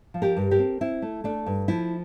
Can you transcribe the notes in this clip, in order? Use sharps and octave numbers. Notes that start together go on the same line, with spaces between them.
F3
G4 A#4
G2
G4 A#4
C4
C4 E4
A3
A3 D4
G2
F3 E4